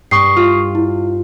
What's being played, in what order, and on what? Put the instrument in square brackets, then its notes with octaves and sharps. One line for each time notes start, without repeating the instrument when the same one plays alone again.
[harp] G2 [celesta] C#6 D#6 C7
[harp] F4
[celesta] E4